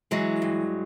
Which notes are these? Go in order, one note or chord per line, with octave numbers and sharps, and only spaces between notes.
E3 F#3 G#3
G2